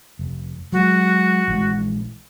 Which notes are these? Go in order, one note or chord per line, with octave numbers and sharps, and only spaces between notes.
F1
F#3 G#3 F#4
A#1 E3 G#3